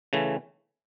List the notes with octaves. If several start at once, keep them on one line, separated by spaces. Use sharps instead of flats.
C#3 E3 A3